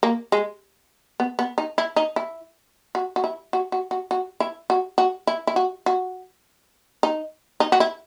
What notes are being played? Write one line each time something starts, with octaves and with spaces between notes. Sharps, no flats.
A#3
G#3
B3
B3
D#4
E4
D#4
E4
F#4
F#4
E4
F#4
F#4
F#4
F#4
E4
F#4
F#4
E4
E4
F#4
F#4
D#4
D#4
F#4
E4